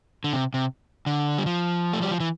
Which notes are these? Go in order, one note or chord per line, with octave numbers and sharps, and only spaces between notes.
D3
C3
C3
D3
G3
F3
A3
G3
F3
E3